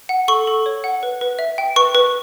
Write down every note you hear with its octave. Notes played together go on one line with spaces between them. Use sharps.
F#5
A4 C#6
A4
C#5
F#5
B4
B4
E5
G5
B4 C#6
B4